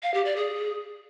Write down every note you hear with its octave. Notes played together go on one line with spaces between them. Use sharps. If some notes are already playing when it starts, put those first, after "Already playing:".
F5
G4
D5
G#4